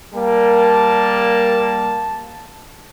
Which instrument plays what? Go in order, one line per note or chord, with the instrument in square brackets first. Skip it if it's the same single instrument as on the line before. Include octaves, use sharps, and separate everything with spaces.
[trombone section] G3 A#3 [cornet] A5